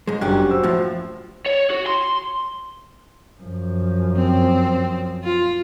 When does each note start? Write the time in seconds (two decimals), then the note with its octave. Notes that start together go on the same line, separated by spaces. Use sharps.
0.07 G#2 G#3
0.21 G1 F#2 C#4 G4 F#6
0.48 F#4 C5 E6
0.63 A2 F3
1.46 C#5
1.71 F#4
1.87 C6
3.40 F#2 F3
4.16 C4
5.24 F4